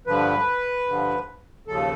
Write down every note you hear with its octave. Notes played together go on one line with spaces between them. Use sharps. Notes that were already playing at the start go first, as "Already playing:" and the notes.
G2 D3 F3 B4
G2 D3 F3
D#2 C#3 F3 A4